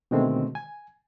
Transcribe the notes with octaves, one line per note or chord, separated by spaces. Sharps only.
B2 D3 D#3 G#3 A3 C4
G#5